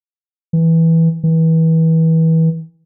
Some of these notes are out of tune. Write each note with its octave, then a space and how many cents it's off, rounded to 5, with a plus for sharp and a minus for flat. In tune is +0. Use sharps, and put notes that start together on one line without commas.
E3 -10
E3 -30